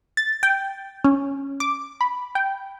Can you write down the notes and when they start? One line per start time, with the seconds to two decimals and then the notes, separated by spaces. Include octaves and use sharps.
0.17 A6
0.43 G5
1.04 C#4
1.60 D6
2.01 B5
2.35 G5